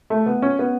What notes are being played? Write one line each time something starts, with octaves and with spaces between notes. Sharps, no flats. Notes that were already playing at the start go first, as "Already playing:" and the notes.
A3
B3
C#4
B3